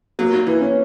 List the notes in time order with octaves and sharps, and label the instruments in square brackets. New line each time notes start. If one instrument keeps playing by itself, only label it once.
[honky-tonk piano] F#3 [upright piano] A#3
[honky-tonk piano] E3
[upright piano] C#4